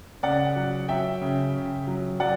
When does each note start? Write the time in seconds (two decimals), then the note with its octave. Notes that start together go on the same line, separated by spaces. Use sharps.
0.23 C#3 D5 F#5
0.56 F#3
0.88 F#3 E5 G5
1.21 C#3
1.54 C#3
1.87 F#3
2.20 F#3 D5 F#5